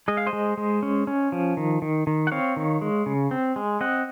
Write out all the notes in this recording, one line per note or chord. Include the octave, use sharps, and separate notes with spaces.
G#3 D#5
F5
C5 D#5
G#3
G#3
C#4
C#4
F3
D#3
D#3
D#3
F#5
C4 C#5 F5
D#3
G#3
C#3
C4
G#3
C4 D#5 F#5